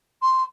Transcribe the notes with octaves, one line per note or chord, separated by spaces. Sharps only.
C6